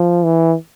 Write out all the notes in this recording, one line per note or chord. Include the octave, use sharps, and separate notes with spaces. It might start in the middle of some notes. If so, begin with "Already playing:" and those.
Already playing: F3
E3